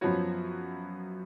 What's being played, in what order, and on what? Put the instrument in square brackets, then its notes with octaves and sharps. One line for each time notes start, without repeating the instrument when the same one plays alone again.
[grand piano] F#2 F3 B3 F#4 C#5